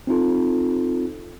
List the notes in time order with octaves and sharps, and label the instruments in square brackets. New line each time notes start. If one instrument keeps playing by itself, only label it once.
[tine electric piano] C4 D#4 F4 A4